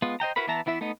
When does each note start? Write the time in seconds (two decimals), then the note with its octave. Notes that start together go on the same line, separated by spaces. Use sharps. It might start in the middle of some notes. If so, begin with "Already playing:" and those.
0.02 G#3 B3 F4
0.20 C5 D#5 G5 A#5
0.36 E4 F#4 A#4 B4 B5
0.47 E3 B3 E5 A5 A#5
0.66 E3 B3 E4 E5
0.81 A3 B3 D#4 D#5